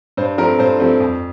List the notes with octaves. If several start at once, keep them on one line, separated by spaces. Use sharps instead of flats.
G2 C5
F3 A3 C4 A#4
G2 C5
F3 A3 C4
F2